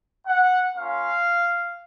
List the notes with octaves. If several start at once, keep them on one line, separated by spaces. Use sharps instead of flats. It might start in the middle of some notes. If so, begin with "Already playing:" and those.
F#5
A#3 C#4 F4 F5